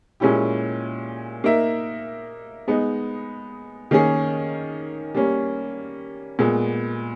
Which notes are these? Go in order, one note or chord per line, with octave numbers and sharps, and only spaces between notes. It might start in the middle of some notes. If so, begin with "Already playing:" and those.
A#2 G#3 C#4 E4 G4
A#3 D#4 A#4 E5
G#3 B3 D#4
D#3 A#3 C#4 G#4
G3 A#3 C#4
A#2 G#3 B3